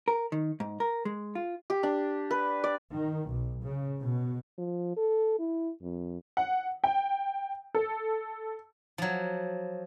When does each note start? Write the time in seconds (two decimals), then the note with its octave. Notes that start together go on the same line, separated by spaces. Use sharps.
0.08 A#4
0.32 D#3
0.60 G#2
0.80 A#4
1.05 G#3
1.35 F4
1.70 G4
1.83 D4
2.31 B4
2.64 D5
2.94 D#3
3.30 B1
3.62 C#3
4.00 B2
4.58 F3
4.96 A4
5.39 E4
5.82 F2
6.37 F#5
6.84 G5
7.75 A4
8.98 F3 F#3